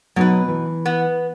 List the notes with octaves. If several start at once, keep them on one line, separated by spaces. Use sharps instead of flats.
B2 F#3 B3 D#4 B4
E3
B3